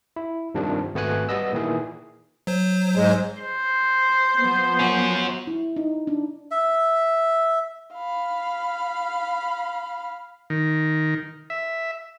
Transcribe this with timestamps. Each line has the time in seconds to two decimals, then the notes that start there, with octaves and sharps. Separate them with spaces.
0.16 E4
0.55 G2 C3 D#3 F3 D4
0.94 G#1 A3 B3 F#4 G#5 F#6
1.29 G3 B3 D#5 E6
1.53 A#2 D#3 E3 E4 G#4
2.47 F#3 C5
2.96 G#2 G#3
3.41 C5
4.38 F3 B3
4.79 C#4 F#4
5.47 E4
5.76 D#4
6.07 D4
6.51 E5
7.94 F5 B5
10.50 D#3
11.50 E5